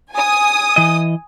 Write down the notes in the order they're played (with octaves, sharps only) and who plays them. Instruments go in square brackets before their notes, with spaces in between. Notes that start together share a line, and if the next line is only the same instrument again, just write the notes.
[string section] G#5 D#6
[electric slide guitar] E3 D#5